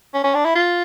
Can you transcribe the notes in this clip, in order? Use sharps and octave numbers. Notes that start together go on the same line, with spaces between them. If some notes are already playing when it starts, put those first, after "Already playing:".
C#4
C#4
D4
E4
F4